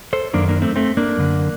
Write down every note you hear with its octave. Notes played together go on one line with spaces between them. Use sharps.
A4 C5
F#2 D#3 A#3 D4
A#3 D4
A3 C4
A3 C4
A#3 D4
F#2 D3